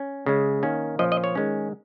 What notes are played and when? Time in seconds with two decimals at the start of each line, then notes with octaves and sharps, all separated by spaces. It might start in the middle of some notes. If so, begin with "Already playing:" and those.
Already playing: C#4
0.26 C#3 G#3 C#4
0.63 D#3 A#3 C#4
0.99 A#2 F3 C#4 D#5
1.12 D#5
1.24 C#5
1.35 D#3 G#3 C#4